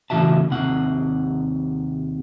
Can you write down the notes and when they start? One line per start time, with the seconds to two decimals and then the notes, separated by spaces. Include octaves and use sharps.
0.10 A2 C#3 E3 F#4 E5 A5
0.51 D#2 C3 F#5